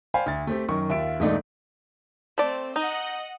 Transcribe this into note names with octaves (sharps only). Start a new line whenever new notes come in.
C5 D5 F5 G5 G#5 B5
D2 A6
A3 C4 G4
F#2 D#3 C#6
D#2 F4 E5 D7
E1 G#2 A3 D#4 D5
A3 C4 D5
D#4 D#5 F#5